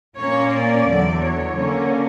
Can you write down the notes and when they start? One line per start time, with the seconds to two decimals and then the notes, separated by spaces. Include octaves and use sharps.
0.17 A#2 A#3 C#4 C#5
0.52 D5
0.86 E2 D3 F#3
1.22 C#5
1.57 D3 A#3 C#4